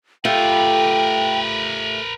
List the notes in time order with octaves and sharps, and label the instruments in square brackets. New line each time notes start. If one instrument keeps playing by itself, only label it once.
[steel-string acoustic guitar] A3 F4 G4 [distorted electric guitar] A#4 B4 [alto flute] G5